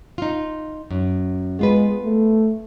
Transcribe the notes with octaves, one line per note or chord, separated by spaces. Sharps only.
D#4 F4
F#2
G#3 B3 F4 B4
A3